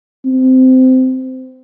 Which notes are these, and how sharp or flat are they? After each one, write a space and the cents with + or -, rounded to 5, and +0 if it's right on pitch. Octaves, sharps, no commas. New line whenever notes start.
C4 -20